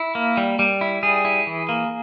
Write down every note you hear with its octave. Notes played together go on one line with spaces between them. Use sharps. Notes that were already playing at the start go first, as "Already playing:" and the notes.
Already playing: E4
A#3
G3
G3
E4
G3 G#4
E4
E3
A#3